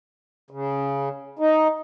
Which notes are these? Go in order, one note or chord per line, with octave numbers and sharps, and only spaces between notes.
C#3
D#4